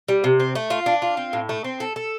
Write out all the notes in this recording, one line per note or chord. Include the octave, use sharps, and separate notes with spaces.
G3
C3
C4
A3
F4
D4
F4
C4
A2
A3
C4
A4
A4